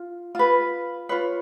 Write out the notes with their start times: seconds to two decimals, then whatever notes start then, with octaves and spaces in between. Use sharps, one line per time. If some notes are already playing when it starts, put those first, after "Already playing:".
Already playing: F4
0.35 F4 B4
1.09 F4 B4 C#5